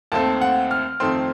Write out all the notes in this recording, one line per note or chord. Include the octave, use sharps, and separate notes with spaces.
D#2 D#3 A3 C4 A5
F#5
F6
F2 D#3 A3 C4 C6